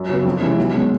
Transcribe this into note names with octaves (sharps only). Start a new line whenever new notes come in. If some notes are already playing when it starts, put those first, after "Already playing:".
Already playing: F#2
C#3 F#3 B3
F2
C3 E3 G#3 C#4
B1
B2 G#3 C#4